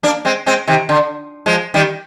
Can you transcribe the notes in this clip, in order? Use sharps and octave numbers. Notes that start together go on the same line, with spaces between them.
A#3 D4
G#3 C4
G#3 C4
C3 D#3
D3
F3 G#3
D#3 G3